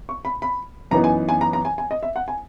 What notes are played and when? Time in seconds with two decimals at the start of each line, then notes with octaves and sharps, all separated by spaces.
0.09 C#6
0.25 B5
0.42 B5
0.91 F#2 E3 B3 D#4 A#5
1.04 G#5
1.29 G#5
1.41 A#5
1.53 A#5
1.65 G#5
1.78 G#5
1.91 D#5
2.03 E5
2.16 F#5
2.28 G#5